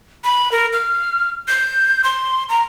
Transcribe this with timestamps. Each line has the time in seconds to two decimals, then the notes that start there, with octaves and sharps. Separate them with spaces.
0.24 B5
0.52 A#4
0.73 F6
1.48 G6
2.04 C6
2.49 A#5